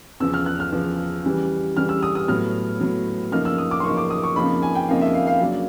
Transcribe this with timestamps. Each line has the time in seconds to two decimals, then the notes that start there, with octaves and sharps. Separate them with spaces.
0.20 E2 C#3 F3 E6
0.34 F6
0.46 F#6
0.60 F6
0.72 E2 C#3 F3
1.24 C#3 E3 G3
1.76 C#3 E3 G3 F6
1.89 E6
2.03 D#6
2.15 D#6
2.28 A2 F#3 B3 F6
2.80 A2 F#3 B3
3.32 F#2 C#3 F3 A#3 D#4 F6
3.45 E6
3.58 D#6
3.71 D6
3.80 C6
3.84 F#2 C#3 F3 A#3 D#4 C#6
3.97 D6
4.10 D#6
4.23 C#6
4.36 F2 C#3 F3 A#3 D#4 B5
4.62 G#5
4.75 G5
4.88 F2 C#3 F3 A#3 D#4 F5
5.01 E5
5.14 F5
5.27 F5
5.41 C#3 F#3 A#3 D4